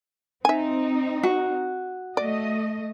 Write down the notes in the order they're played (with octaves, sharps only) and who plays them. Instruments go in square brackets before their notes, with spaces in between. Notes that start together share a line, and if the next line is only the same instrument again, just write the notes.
[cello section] C4 D#4 [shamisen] E5 G#5
[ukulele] F#4
[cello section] A3 D#5 [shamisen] D5